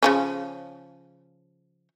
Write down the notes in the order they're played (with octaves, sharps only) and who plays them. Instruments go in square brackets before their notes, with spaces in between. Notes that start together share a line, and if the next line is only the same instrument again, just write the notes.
[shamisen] C#3 F3 C#4